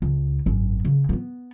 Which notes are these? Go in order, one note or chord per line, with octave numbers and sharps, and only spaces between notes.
C#2
G#1 F#2
C#3
A#3 B3